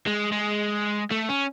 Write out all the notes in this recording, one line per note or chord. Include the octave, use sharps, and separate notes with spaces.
G#3
G#3
A3
C#4